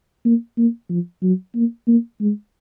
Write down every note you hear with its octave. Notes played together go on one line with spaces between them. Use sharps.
A#3
A#3
F3
F#3
A#3
A#3
G#3